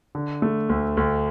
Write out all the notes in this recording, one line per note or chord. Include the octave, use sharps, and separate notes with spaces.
D3
A3
D2
D2